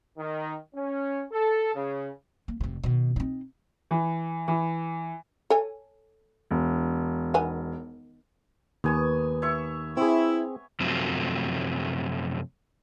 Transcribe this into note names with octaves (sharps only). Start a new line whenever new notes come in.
D#3
C#4
A4
C#3
A#3
F1 C3
B2 D#3
C4 D#4
E3
E3
A4 C#5 G#5
E1
D#3 B3 G#5
D#2 B3 G#5 C#6
C#5 E5 C#6
C4 E4 G#4 C#6
F#2 C3 F3 F#3 A3